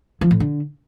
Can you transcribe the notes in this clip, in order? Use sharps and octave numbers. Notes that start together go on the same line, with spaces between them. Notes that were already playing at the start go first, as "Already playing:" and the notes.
F3
A2
D3